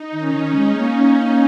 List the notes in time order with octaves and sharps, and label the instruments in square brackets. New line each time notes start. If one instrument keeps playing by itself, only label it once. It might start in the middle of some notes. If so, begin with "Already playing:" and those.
Already playing: [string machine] D#4
[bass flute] D#3
[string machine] C#4
[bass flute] D#3
[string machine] C#4
[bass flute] G#3
[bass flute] A#3 [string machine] D#4